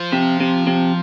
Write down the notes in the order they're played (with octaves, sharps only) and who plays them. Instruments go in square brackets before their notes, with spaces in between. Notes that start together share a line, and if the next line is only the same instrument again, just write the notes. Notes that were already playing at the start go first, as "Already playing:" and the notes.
Already playing: [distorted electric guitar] F3
[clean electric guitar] C3
C3
C3